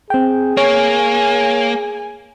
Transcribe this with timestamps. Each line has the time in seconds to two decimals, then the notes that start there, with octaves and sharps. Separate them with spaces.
0.10 C4 G#4 G5
0.57 A#3 C#5 G#5